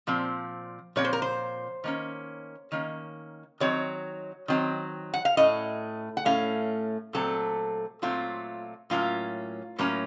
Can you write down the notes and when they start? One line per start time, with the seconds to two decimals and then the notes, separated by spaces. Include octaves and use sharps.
0.07 A#2 F3 C4
0.96 A#2 F3 C4 C#5
1.04 C5
1.13 A#4
1.22 C5
1.84 D#3 A#3 C#4
2.72 D#3 A#3 C#4
3.60 D#3 F#3 C4 C#5
4.48 D#3 F#3 C4
5.13 F#5
5.25 F5
5.37 A2 A3 C#4 D#5
6.17 F#5
6.25 A2 A3 C#4 F5
7.13 A#2 F#3 A3 C4 A4
8.02 A#2 F#3 A3 C4 F4
8.90 A2 F#3 A#3 C#4 F4
9.79 A2 F#3 A#3 C#4